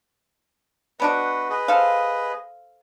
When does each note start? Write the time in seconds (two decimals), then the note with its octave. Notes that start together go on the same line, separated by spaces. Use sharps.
1.00 B3 D4 F#4 B4 D#5
1.49 G#4 B4 D#5
1.68 A4 C5 F5